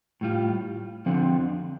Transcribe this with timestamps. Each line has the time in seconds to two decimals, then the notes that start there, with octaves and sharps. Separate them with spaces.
0.21 A2 G3 F4
1.06 D3 F3 C4